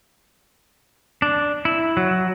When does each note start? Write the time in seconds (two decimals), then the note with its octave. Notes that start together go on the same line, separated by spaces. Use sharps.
1.22 D4
1.65 E4
1.97 F#3